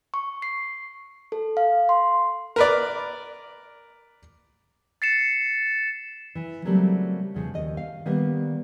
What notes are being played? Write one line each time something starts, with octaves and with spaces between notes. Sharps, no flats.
C#6
C7
A4
F5
C6
A#4 B4 D5
A6 C7 C#7 E7
E3
C#3 F#3 G3 A3 A#3 C4
E2 C#3 F3
D#2 D#5
F5
D#3 G3 A#3 B3